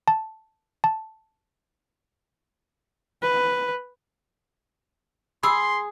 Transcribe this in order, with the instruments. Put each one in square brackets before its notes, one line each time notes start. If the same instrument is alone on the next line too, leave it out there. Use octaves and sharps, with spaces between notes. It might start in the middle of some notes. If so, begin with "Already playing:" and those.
[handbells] A5
A5
[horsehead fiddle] B4
[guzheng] G#4 [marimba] B5 E6 [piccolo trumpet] C6